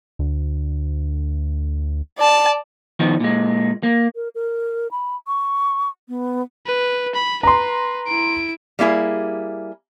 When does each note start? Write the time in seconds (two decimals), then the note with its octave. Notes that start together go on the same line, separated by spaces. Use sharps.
0.19 D2
2.18 D5 A5
3.00 D#3 F3 B3 D#4
3.20 A#2 G#3
3.83 A#3
4.15 A#4
4.35 A#4
4.91 B5
5.27 C#6
6.09 B3
6.66 B4
7.15 B5
7.43 B4 A#5 C6
8.08 E4 D7
8.79 G3 A#3 E4 G#4